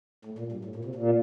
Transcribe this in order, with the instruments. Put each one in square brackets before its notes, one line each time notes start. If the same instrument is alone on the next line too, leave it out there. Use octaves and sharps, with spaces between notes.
[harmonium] A2
A#2
G2
A2
A#2
C3
A#2